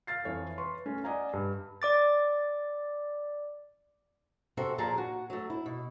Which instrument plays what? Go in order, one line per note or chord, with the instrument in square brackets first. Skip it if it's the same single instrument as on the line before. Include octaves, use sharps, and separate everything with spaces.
[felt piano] F5 F6 A6 C7
F2 E3 C#5 F5 G#5
B4 C6 C#6
A3 C#4
D5 D#5 F#5 G#5 A#5
G2
[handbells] D5 D6 A6
[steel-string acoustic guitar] C3 C4 F#4 A4 E5
D#2 A#2 F3 G#4 A5 A#5
F#4
F#3 A3
E4
B2